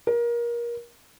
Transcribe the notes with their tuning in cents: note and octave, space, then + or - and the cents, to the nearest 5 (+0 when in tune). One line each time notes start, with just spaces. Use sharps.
A#4 +25